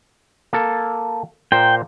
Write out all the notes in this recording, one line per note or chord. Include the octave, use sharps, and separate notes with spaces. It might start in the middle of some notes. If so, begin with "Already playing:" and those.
A#3 A4
A#2 C5 G5 A#5